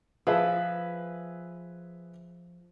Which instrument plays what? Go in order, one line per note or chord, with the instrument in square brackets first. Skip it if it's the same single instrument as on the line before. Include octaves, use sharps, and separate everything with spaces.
[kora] F3 [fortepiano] G#4 B4 E5